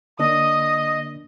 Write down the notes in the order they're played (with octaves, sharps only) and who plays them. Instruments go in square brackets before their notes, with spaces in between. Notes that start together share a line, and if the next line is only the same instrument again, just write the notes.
[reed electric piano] D3 A#3 D4 [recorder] D#5 [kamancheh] D#6